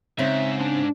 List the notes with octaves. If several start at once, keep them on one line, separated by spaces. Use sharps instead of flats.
G#2 C#3 C4 E5
D4